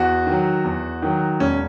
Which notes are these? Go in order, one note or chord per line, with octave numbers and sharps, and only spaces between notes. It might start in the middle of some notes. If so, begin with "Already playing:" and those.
Already playing: E2 F#4
D#3
F#3
E2
D#3 F#3
E1 C#4